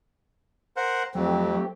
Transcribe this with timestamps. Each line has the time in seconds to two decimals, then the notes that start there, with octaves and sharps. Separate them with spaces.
0.76 A#4 C5 F#5
1.15 F2 F#3 A3 C4 G4